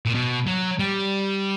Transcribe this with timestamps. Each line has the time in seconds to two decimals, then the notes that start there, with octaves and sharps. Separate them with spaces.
0.06 A#2
0.14 B2
0.47 F#3
0.79 G3